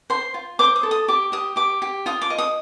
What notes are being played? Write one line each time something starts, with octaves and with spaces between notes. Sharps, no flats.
C5 C6
F4
C5 D6
D#6
A4
D#6
G4 D6
G4 D#6
G4 D6
G4
F4 D#6
D6
D#5
D#6